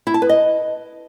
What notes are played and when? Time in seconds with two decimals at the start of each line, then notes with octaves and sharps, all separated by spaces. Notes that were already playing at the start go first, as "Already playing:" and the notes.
0.07 E4
0.14 A5
0.22 B4
0.29 D#5